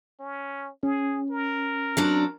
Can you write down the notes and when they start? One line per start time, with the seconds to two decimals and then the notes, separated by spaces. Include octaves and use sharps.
0.19 C#4
0.83 C#4 G#4
1.30 A#4
1.97 F#3 C4 D4